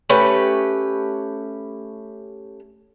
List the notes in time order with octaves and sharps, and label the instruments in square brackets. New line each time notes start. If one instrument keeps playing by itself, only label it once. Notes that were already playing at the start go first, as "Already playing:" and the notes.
[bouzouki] A3 C#4 G4 B4